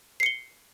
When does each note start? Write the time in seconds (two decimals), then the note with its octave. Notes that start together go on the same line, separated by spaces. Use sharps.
0.20 C7
0.23 C#7
0.26 G7